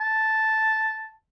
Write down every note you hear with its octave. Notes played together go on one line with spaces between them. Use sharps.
A5